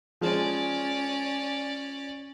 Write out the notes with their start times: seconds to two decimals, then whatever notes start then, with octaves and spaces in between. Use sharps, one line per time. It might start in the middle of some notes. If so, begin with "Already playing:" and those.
0.21 F3 G#3 C#4 D5